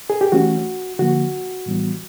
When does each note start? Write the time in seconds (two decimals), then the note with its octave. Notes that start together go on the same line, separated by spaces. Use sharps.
0.10 G#4
0.21 G4
0.32 E3 A3 C#4 F#4
0.99 D3 F3 A#3 F#4
1.66 A2 E3 G3 B3